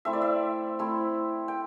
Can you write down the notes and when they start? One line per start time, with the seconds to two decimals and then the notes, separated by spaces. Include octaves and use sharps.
0.05 A3 C4 E4 E5
0.13 D5
0.22 E5
0.79 A3 C4 E4
1.48 G5